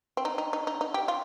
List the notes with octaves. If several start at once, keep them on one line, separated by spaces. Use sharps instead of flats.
C4
D#4
D#4
D#4
D#4
D#4
G4
F4